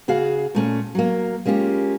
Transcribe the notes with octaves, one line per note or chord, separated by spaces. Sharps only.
C#3 F#4 G#4 F5
A#2 A3 C#4
F#3 A#3
G#3 A#3 C#4 F4 G4